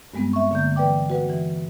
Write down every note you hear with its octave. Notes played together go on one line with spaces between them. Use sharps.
G2 G3 G#3 B3 C4
E5 C#6
D3 A#3 G6
E3 B4 D5 G5 D6
F#4 B4 F#5
E3